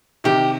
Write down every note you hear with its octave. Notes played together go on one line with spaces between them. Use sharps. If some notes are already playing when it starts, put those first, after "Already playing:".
C3 D#3 G4